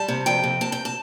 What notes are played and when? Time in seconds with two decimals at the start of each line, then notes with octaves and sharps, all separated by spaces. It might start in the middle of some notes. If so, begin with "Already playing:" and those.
Already playing: G3 A5
0.08 C3
0.26 F2 G5
0.44 C3
0.61 C3 A5
0.72 G5
0.85 A5